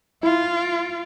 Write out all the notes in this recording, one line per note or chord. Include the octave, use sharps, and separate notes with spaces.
E4 F4
D7